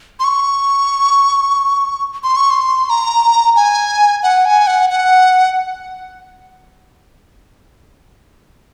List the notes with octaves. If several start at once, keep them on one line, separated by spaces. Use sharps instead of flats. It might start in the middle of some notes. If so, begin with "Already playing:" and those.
C6
C#6
C6
C#6
C6
A#5
G#5
F#5
G#5
F#5
F#5